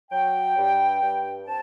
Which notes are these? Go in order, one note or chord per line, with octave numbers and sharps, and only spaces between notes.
F#3 G5
G2
G2
C4 A5